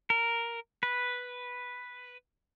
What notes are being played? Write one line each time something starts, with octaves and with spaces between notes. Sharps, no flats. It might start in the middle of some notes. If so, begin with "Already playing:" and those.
A#4
B4